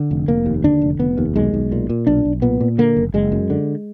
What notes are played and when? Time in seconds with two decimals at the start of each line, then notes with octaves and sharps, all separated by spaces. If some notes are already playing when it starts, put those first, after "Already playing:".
Already playing: D3
0.11 F1
0.28 F1 A#3
0.46 D#2
0.64 D3 D4
0.81 F1
0.99 F1 B3
1.18 D#2
1.36 B1 G#3
1.54 B1
1.72 A#2
1.89 A#2
2.07 B1 D4
2.25 B1
2.42 A#2 B3
2.60 A#2
2.78 D3 A#3
2.97 F#1
3.14 F#1 G#3
3.32 F#2
3.50 D3